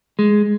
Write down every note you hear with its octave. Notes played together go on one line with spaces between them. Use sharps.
G#3